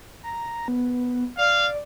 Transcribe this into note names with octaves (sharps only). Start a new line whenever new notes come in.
A#5
B3
D5 F5